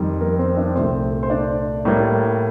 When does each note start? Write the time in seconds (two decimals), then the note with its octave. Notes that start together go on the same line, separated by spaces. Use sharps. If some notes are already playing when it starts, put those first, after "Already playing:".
Already playing: F2 D#3 G3
0.21 A#3 A#4
0.39 C4 C5
0.57 D4 D5
0.75 C2 A#2 A3 C4 C5
1.23 C5
1.30 D4 D5
1.85 A2 G3 A#3